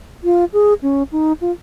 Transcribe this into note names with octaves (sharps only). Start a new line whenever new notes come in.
F4
G#4
C#4
D#4
F4